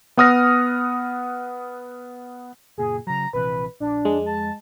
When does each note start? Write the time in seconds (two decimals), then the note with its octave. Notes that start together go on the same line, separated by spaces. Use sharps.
0.17 B3 F#5 D#6 F6 A#6
2.78 F#1 A#2 G#4
3.07 C#3 F#3 A#5
3.33 A#1 C3 E3 B4
3.80 A#1 D4
4.05 F2 G#3
4.26 A5